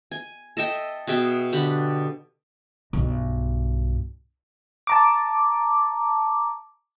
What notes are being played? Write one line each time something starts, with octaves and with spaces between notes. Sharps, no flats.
G#5
A4 D#5 E5 G5
B2 G#4 E5 G5
D3 G4 B5
B1 G2
A5 A#5 D6